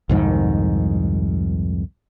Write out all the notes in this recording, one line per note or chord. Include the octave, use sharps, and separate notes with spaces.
C2 F2 G#2 D#3